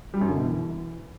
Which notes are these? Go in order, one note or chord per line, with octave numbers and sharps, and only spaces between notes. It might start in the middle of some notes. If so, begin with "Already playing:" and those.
G3
F#2
D3
B2
E3